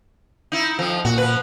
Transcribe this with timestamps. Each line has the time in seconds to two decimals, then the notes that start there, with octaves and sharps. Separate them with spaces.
0.52 D#4 E4
0.79 F2 F3
1.05 A#2 F#4
1.18 F3 B4